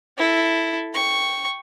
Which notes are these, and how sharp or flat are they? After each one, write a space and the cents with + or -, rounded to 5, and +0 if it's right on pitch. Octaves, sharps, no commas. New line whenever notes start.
E4 +0 A4 +0
G5 +0 C#6 +0